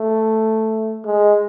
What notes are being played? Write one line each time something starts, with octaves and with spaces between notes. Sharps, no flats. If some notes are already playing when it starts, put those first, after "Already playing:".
Already playing: A3
G#3